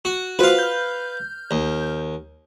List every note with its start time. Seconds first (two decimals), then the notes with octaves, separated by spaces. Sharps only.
0.05 F#4
0.39 F4 F#4 B4 C5 F5
0.59 F6 G6
1.51 D#2